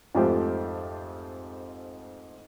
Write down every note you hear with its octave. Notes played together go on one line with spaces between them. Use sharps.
F2 G#2 A3 F4 G4 C5